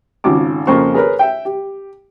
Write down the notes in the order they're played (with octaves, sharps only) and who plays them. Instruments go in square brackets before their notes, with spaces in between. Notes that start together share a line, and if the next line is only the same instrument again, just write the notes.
[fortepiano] G#1 C#3 F4 D6
F2 C#3 A#3 C4 C5 C#6
G#4 A#4 B4 C#5
E5 G5
G4